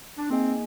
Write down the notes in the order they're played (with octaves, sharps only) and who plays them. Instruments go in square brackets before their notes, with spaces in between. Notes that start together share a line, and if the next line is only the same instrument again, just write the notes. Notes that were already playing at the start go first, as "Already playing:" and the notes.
[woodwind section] D4
[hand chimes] A#3 D#4 G#4 D#5 G#5 [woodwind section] C4